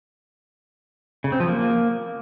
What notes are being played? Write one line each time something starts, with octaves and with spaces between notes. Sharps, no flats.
C#3
C4
F3
A#3